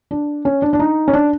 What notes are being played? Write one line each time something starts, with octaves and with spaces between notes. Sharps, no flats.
D4
C#4
D4
D4
D#4
C#4
D4